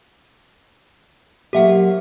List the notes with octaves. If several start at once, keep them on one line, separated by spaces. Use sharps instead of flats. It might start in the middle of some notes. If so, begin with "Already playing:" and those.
F#3 A#3 G4 C5 E5 F#5